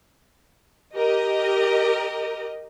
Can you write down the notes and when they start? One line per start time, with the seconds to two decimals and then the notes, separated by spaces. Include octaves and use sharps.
0.95 G4 A#4 D#5